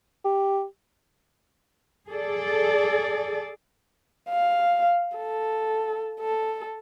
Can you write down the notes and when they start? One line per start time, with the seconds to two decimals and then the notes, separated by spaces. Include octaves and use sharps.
0.25 G4
2.09 G#4 A4 D5
4.30 F5
5.17 A4
6.21 A4